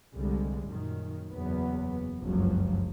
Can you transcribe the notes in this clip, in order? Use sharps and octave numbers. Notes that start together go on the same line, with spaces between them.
C2 D3 G3 G#3
F#2 A#2 D#3
F#1 E2 F#3 B3
F#1 C#2 G2 F3 F#3